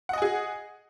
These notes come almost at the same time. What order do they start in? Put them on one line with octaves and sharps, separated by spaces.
F#5 D#5 G#5 G#4